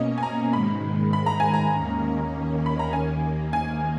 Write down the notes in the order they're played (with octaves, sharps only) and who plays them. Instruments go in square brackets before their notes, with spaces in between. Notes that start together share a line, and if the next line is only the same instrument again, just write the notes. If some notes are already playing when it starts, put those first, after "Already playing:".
Already playing: [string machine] B2 A#3 C#4 [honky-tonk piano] D#5
[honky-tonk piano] G#5
A#5
[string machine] G#2 D#3 G#3 [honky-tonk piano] B5
[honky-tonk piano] B5
A#5
G#5
A#5
[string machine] D#2 D#3 A#3 C#4
[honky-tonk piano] B5
A#5
[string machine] D#2 D#3 A#3 [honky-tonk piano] G#5
[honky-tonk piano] G#5